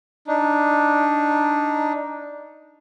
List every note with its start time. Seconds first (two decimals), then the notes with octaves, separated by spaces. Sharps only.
0.27 D4 D#4